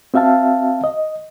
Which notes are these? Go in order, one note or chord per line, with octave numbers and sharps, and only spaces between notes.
C4 F#4 E5 F5 A5
D#5